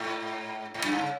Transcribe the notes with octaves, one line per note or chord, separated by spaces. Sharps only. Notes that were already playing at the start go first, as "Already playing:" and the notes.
Already playing: G#2
G#2
F#2
G2
C#3